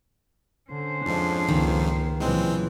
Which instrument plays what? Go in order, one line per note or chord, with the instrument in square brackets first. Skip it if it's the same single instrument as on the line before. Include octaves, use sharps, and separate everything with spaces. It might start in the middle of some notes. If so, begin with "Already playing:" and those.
[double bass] D3 [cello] C#4 C5
[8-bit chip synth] F2 G#2 F3 [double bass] D4
[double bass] C#2 A#3 [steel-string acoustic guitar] D#3
[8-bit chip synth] C2 G#3 C4 [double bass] A#2 E3 [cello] C#3 F#3